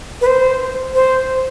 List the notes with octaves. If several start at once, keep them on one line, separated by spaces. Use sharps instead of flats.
B4
C5
C5